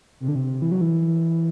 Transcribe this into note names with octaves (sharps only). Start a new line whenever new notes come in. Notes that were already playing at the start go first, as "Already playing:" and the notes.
C3
D3
C3
E3
F#3
E3